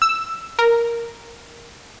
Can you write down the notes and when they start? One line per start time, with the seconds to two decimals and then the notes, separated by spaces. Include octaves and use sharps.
0.02 E6
0.59 A#4